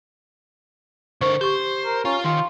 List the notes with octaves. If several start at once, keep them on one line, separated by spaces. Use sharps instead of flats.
D3 A#4 C5 C#6
G4 C5 C#6
A#4
C#4 F4
D#3 F4